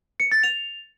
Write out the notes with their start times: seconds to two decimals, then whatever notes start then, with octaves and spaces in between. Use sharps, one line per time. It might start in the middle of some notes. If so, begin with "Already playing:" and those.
0.20 C#7
0.32 A6
0.43 F7